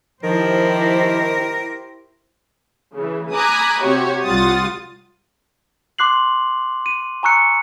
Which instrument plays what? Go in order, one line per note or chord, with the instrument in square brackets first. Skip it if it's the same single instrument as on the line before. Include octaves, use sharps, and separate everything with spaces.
[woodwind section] D#3 [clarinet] F3 [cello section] E4 G4 C5 [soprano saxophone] A#4
[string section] C#3 E3
G#5 A#5 B5 D6 D#6 F#6
C3 F#4 G4 C#5
C2 G3 F4 F#5 D#6 A6
[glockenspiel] C6 D6 F#6 C7 F#7
D#7
G#5 A#5 C#6 E6 F#6 C#7